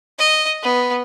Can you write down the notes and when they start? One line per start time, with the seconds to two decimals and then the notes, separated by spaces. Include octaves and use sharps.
0.19 D#5
0.63 B3